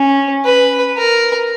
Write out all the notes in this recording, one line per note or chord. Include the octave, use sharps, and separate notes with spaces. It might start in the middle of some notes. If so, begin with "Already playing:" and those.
Already playing: C#4
B4
A#4